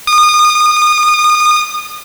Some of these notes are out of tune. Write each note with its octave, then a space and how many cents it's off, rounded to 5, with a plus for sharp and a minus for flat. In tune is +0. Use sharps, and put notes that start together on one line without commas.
D#6 -30